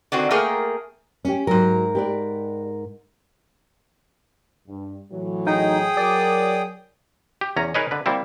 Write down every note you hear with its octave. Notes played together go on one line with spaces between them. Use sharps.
D3 D#3 C4 F#4
A3 A#3 G#4 A#4 G5
C#4 G4
G#2 F#3 A#4
G4 B4 D5
G2
A2 E3 F#3
D#4 G#4 G5 D#6
F#3 A#4 D5
G4
E2 C#4 A#5
D#4 G#4 A#4 B4 C#5 D#5
D3 B4
G3 A#3 C4 E4